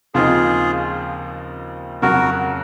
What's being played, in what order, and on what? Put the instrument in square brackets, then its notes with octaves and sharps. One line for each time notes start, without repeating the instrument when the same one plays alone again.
[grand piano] D#2 C#3 F3 C4 D#4 [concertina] F4 G#4
[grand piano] F2 C#3 F#3 [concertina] F#4 A#4